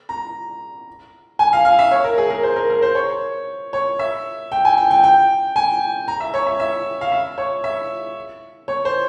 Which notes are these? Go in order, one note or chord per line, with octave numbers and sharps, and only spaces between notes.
A#5
G#5
F5
F5
E5
C#5
A#4
G#4
A#4
C5
A#4
A#4
C5
C#5
C#5
E5
G5
G#5
G5
G5
G5
G#5
A#5
E5
C#5
E5
E5
F5
E5
C#5
E5
C#5
C5